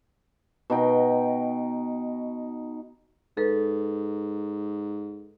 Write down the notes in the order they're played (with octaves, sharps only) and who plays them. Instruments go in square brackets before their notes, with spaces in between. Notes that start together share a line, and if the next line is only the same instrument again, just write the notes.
[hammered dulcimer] B2 D#4 G5
[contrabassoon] G#2 [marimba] A4 B4